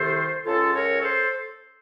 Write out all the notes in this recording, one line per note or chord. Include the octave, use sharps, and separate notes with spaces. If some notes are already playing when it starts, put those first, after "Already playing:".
Already playing: C2 C3 D#3 A4 C5
C#2 C#3 F4 A4
A#4 C#5
A4 C5